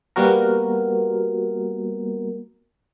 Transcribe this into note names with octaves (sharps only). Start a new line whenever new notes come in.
G3 A#3 B3 F#4 A#4